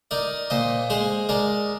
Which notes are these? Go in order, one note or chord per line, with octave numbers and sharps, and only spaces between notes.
D#4 A#4 D5
A#2 C5 D#5
G#3 G#4 C5
G#3 A#4 D5